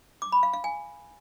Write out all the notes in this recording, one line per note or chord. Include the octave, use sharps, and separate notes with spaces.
D6
B5
F5
F5
G#5